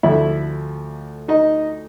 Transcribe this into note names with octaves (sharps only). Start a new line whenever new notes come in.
D2 D3 F3 A3 E4 E5
D#4 D#5